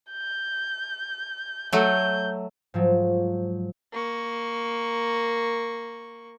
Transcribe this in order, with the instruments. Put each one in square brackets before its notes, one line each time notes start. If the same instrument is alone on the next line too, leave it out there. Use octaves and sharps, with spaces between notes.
[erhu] G6
[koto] F#3 A3 [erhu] G6
[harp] G#2 F3 F#3
[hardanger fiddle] A#3 C#6